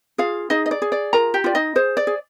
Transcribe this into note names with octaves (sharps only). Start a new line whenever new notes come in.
F4 G#4 F5
D#4 G#4 D#5
D#5
D5
G#4
D5
F4 A#4 A#5
G4 G5
F4 D5
D#4 D#5
G#4 C5
D5
G#4